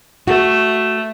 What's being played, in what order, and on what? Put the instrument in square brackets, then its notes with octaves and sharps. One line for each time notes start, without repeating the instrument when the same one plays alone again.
[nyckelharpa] A3 [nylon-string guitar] F#4